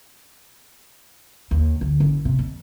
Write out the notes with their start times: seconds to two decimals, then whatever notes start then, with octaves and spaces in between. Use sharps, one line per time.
1.51 D#2
1.81 D2
2.00 F#1
2.25 C3
2.39 F2